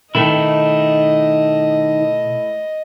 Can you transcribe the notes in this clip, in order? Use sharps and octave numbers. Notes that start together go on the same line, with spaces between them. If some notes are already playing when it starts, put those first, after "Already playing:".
B2 D#3 A3 E4 D#5